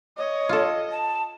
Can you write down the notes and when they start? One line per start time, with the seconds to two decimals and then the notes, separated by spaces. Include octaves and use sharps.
0.18 C#5 D#5
0.49 F4 A4
0.91 A5